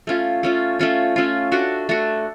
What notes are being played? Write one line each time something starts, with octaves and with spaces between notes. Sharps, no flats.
A3 C#4 F4
A3 C#4 F4
A3 C#4 F4
A3 C#4 F4
A3 D4 F#4
A3 D4 F#4